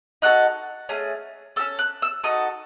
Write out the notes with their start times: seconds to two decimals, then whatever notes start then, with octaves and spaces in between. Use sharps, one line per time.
0.22 D#4 F#4 A4 F#6
0.89 A3 C#4 G#4
1.56 C#4 F#4 A4 E6
1.79 F#6
2.02 E6
2.24 D#4 F#4 A4 D#6